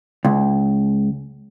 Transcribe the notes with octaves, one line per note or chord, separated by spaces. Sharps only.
C#2